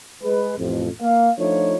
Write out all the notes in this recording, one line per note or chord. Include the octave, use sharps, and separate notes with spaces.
G#3 B4
A1 F2
A#3 F5
F3 A3 D4 D#4 F4 C#5